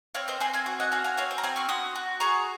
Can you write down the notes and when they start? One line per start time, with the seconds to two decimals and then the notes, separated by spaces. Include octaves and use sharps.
0.15 C4 C#5 F5
0.28 C5 D#5
0.40 C4 G#5 C6
0.53 F5 G#5
0.66 F#4
0.80 D#5 F#5
0.92 F#4 F5 G#5
1.04 F5 G#5
1.17 C4 C#5 F5
1.31 C5
1.38 A#5
1.43 C4 F5 G#5
1.56 C#6 F6
1.69 F#4 C6 D#6
1.96 F#4
2.20 G#4 A#5 C#6